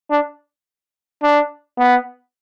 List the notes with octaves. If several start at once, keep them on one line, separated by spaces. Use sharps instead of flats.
D4
D4
B3